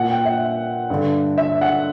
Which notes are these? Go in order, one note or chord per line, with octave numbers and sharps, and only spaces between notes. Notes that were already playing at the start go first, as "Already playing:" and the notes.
Already playing: A#2 F#5
G5
E5
G2 D3
E5
F#5